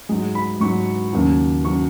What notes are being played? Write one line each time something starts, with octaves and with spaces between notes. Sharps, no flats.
G#2 F#3 G#4
B5
G#2 F#3 C#6
D#2 C#3 F#3
C#3 F#3 C#6